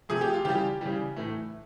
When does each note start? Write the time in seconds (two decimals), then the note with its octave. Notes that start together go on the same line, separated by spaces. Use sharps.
0.09 C3 F3 A3 G#4
0.21 G4
0.33 F4
0.45 C#3 E3 G3 G4
0.81 C#3 E3 G3
1.16 A2 E3 A3